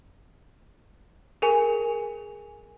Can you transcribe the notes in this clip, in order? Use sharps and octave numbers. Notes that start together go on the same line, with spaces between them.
G#4 A#4 G#5